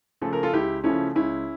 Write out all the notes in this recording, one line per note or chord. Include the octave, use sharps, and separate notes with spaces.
C#3 F3 A3 A4
A#4
F4 A4
C#2 E4 G4
C#3 F3 A3 C#4 E4
C#2 C#4 E4